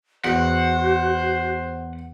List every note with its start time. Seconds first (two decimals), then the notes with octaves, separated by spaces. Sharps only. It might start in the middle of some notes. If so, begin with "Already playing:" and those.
0.24 E2 F#4 C5 F#5